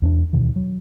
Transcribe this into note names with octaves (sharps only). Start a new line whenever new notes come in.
E2 B3 D4
D2 B2 D#3 E3
F#3